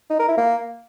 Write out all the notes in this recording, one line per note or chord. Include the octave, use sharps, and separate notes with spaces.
D#4
A#4
E4
A#3